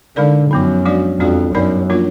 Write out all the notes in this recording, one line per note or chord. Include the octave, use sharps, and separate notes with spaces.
D3 G#3 D#4 A#4 D5
F#2 F3 B3 D#4
F3 G#3 D4 F#4 D5
F2 G#3 D4 F#4 D5
F#2 B3 D#4 A#4 D5
F3 A#3 D4 F4 A#4